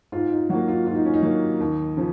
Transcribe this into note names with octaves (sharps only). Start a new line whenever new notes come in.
G#2 F4
D#4
F#3 A#3 F#4
F4
G#2 F4
D#4
C#4
D#4
F#3 A#3
D#2
C#3 F3